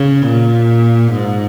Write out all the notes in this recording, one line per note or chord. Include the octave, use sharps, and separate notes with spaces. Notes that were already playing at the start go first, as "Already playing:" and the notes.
Already playing: C#3
A#2
G#2